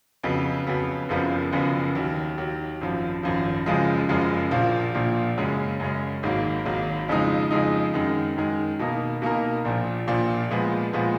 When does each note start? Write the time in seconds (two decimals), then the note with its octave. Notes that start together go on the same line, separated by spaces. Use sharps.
0.23 F2 C#3 F#3 B3
0.67 F2 C#3 F#3 B3
1.09 F#1 F#2 C#3 F3 B3
1.53 F#1 F#2 C#3 F3 B3
1.95 D#2 D#3 F#3
2.38 D#2 D#3 F#3
2.81 G#1 F#2 F3
3.23 G#1 F#2 F3
3.66 F#1 F#2 C#3 F3 G#3
4.09 F#1 F#2 C#3 F3 G#3
4.51 A#1 A#2 F3 A#3
4.94 A#1 A#2 F3 A#3
5.37 F#2 C#3 G#3 C#4
5.80 F#2 C#3 G#3 C#4
6.23 G#1 G#2 F#3 A#3
6.65 G#1 G#2 F#3 A#3
7.08 F2 C#3 F3 G#3 D#4
7.51 F2 C#3 F3 G#3 D#4
7.94 F#2 D#3 G#3
8.37 F#2 D#3 G#3
8.79 B2 A#3 D#4 A#4
9.22 B2 A#3 D#4 A#4
9.65 A#1 A#2 F3
10.07 A#1 A#2 F3
10.50 A#2 F3 G#3 B3
10.93 A#2 F3 G#3 B3